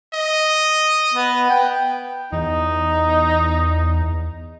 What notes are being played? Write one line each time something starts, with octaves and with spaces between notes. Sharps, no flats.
D#5
B3
G5
E2 D#4